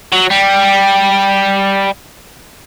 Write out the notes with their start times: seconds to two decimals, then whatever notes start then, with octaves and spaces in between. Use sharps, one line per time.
0.13 F#3
0.31 G3